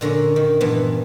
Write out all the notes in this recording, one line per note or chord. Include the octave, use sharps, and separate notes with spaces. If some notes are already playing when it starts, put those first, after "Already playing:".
A#2 D3 A#3 C#4
D#3
G2 A#2 E3 B3